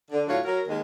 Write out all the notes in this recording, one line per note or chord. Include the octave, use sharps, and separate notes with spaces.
D3
A2 D3 F#3 F4 F#4 C#5
F#3 A#4
D#2 D#3 G#3